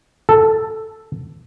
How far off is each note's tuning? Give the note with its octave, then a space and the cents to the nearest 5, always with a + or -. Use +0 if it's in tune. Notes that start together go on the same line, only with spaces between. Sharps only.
A4 +0 A5 +0